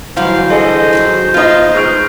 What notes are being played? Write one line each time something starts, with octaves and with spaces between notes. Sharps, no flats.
G2 D3 E3 F#3 C5 F5
G#4 A4 C5 D#5
D#3 E3 F#3
F3 B3 D#4 F4 D#5
G#3 C#6 F6 D7